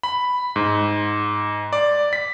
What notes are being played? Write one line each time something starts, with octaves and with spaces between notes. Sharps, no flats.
B5
G#2
D5
B6